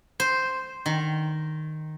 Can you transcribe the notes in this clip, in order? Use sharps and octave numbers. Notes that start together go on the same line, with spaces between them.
C5
D#3